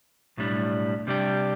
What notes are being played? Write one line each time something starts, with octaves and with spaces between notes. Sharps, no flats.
B1 A2 G3 D4
C3 G3 D4 G4